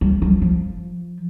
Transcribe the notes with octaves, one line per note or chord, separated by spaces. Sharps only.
G3
F3
F3